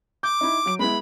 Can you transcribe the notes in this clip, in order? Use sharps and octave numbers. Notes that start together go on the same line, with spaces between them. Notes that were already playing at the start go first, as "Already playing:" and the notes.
D6 G6
D#4 E4
F#3 D7
G#3 B3 E4 B5